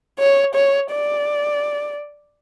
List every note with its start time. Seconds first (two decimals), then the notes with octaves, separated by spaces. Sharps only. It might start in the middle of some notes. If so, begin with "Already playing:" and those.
0.19 C#5
0.55 C#5
0.91 D5